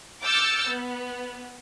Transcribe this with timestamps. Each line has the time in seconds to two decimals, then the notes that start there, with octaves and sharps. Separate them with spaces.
0.24 D6 E6 F6 G6 A6 C#7
0.68 B3